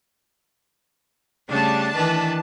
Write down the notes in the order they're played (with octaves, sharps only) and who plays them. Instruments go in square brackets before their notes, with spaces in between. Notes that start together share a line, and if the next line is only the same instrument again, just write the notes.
[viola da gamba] C#3 G3 A3 [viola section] D4 A5
[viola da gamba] D#3 E3 B4